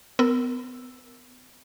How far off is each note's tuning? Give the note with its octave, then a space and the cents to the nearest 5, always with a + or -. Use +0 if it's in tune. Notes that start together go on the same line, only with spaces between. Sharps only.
B3 +30 A#4 +0 E6 +0